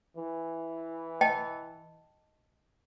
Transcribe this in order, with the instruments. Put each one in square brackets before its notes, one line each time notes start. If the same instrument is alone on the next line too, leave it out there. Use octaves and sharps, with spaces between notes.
[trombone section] E3
[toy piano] D#5 G5 A5